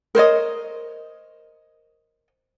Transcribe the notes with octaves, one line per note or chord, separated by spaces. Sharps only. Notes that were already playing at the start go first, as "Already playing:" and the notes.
A#4 C5 C#5 D#5